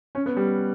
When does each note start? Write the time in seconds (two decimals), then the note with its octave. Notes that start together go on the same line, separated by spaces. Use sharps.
0.15 C#4
0.26 B3
0.37 G3